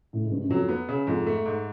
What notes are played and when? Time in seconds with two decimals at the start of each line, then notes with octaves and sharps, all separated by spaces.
0.13 A2
0.23 G#2
0.32 G2
0.41 F#2
0.50 F2 F#3
0.69 B3
0.89 C#3
1.07 F2 G#2
1.27 A3
1.46 G#2